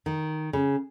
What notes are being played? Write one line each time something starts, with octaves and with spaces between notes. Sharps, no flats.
D#3
C#3